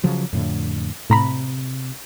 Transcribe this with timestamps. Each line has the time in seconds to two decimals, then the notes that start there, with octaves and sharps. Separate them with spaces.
0.04 C#3 F3 F#3
0.33 F2 A2 D3
1.10 A2 C3 A#5 B5